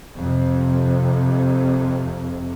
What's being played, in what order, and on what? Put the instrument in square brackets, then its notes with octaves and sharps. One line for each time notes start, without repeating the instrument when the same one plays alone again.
[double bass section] F2 C3